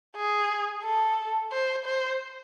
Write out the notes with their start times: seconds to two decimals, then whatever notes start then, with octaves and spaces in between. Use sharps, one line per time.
0.16 G#4
0.84 A4
1.52 C5
1.85 C5